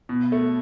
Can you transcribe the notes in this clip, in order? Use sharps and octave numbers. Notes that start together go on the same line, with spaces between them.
B2
A3